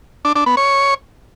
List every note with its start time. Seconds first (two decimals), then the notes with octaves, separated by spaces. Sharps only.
0.25 D4
0.36 D4
0.46 B3
0.57 C#5